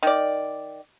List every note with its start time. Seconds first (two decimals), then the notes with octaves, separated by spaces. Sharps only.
0.03 D#3 D5